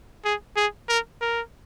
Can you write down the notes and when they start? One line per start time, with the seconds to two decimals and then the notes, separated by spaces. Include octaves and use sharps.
0.25 G#4
0.57 G#4
0.89 A#4
1.21 A#4